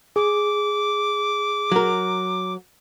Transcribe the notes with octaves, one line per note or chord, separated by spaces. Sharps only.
G#4 D6
F#3 A#4